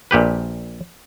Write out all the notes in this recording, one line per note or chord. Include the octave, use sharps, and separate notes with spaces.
A#1 A#2 G4 B4